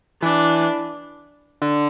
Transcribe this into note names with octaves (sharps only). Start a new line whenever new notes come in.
E3 D4
D3